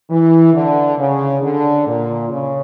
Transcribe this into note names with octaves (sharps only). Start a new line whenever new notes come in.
E3
D3
C#3
D3
A#2
C#3